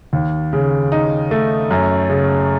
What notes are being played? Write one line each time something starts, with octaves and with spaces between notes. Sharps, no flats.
D#2
C#3
D#4
A3
F#2
C#3